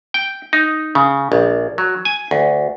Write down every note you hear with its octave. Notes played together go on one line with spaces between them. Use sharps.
G5
D#4
C#3
A#1
F#3
G#5
D2